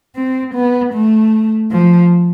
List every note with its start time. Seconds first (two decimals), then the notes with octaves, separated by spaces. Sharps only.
0.16 C4
0.55 B3
0.94 A3
1.72 F3